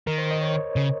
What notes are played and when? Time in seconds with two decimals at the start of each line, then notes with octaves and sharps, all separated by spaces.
0.07 D#3 A#4
0.18 C5
0.31 D#5
0.41 C#5
0.76 C#3